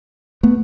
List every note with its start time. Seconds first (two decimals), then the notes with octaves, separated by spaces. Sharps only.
0.43 A3 B3